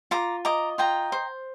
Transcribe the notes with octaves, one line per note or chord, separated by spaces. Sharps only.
F4 A#5 D6
D#5 A#5 D6
F4 G5 A#5
C5